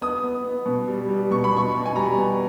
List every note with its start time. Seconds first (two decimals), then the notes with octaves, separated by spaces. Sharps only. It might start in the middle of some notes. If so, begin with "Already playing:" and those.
0.01 B3 D#6
0.23 B3
0.44 B3
0.66 B2
0.88 G3
1.09 G3
1.31 B2 C#6
1.44 B5
1.52 B2 C#6
1.74 B2
1.86 G#5
1.96 G3 A#5
2.17 B3